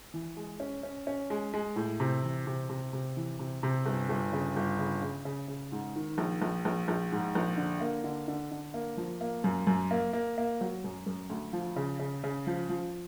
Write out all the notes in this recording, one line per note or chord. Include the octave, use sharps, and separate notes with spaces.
E3
G#3
C#4
C#4
C#4
G#3
G#3
A2
C3
E3
C3
C3
C3
E3
C3
C3
G1
G1
C#3
G1
C#3
C#3
C#3
C#3
G#2
D#3
A#1
A#1
A#1
A#1
G#2
A#1
D3
A#3
D3
D3
D3
A#3
F3
A#3
F#2
F#2
A#3
A#3
A#3
F#3
F#2
F#2
D2
F3
C#3
C#3
C#3
F3
F3